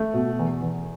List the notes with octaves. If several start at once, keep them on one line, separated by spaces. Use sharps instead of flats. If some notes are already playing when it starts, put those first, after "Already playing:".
Already playing: A3
B2
E2
E2